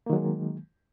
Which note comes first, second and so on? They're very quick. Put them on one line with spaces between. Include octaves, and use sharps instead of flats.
A#3 D#3 F#3 G#3